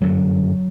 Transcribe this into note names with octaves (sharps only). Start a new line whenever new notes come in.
G1 F#2 D3 F#3